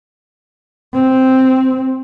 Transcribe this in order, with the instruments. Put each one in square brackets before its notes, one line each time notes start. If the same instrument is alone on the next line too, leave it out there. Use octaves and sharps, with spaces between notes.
[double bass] C4